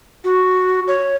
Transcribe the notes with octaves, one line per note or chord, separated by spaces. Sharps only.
F#4
C#5